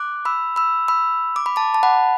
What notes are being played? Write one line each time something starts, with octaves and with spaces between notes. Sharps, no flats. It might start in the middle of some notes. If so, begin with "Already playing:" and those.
Already playing: D6 F#6
B5 E6
B5 E6
B5 E6
D6
B5
A5 D6
A5
F#5 B5